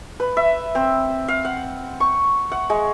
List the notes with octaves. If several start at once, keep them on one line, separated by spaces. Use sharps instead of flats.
B4
E5
C4
F5
F#5
C#6
F#5
G#3